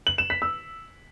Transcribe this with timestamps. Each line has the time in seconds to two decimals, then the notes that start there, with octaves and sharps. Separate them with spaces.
0.07 F#7
0.18 E7
0.30 B6
0.42 E6